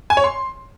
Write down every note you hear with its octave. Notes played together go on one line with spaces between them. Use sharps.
G#5
C#5
C6